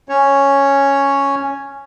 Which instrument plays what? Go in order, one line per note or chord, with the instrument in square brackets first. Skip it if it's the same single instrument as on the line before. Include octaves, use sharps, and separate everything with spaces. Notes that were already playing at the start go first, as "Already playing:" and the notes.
[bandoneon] C#4 C#5